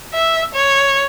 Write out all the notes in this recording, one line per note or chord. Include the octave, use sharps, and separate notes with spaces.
E5
C#5